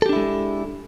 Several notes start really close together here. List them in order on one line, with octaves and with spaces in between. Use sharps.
A4 G4 D4 E4 G#3